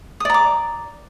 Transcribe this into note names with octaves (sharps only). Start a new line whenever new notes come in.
D5 A#5 D6 D#6